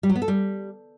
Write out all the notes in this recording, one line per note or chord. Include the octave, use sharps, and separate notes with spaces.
G3
F#3
B3
A4
G3